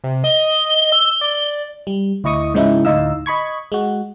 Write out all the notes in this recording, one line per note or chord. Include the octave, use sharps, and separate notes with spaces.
C3
D#5 G7
E6
D5
G3
D2 E4 D#5 C#6 D#6
G#2 C#3 F3 G#3 D#4 E4
D2 A2 D#4 D#5 F5 E6
D#5 B5 C#6 G#6
G#3 F#4